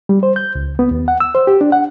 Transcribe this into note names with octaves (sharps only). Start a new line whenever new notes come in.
G3
C5
G6
C#2
B3
D#2
F#5
E6
C5
G4
D4
F#5